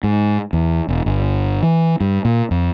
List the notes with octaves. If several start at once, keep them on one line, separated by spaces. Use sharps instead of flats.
G#2
E2
E1
G1
E3
G2
A#2
F2